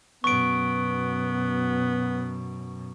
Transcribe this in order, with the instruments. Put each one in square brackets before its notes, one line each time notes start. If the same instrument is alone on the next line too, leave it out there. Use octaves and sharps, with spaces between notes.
[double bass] F#2 B2 [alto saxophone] B3 [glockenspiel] C#6 D7